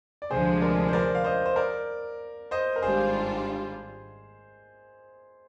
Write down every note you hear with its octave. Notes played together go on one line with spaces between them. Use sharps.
D5
D2 C3 F3 G#3 D4 G#4 C5
A#4 D5
C5
A#4 D5
F5
C5 D#5
C5
A#4 D5
C5 D#5
A#4
G#1 G#2 G3 D4 F4 G#4 C5